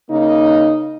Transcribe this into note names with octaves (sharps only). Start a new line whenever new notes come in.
C#3 A#3 D#4